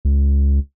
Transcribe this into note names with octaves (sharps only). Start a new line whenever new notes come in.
C#2